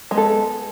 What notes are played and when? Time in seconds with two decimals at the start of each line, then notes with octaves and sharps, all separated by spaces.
0.11 G#3
0.14 B3
0.17 A4